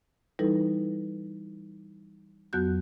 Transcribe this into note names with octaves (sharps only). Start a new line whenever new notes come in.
E3 G3 D#4 E4 A4 B4
F2 F#3 B3 F#4 F#6 G6